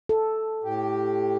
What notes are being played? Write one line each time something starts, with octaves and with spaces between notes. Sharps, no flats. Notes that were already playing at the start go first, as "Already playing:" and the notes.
A4
A2 G4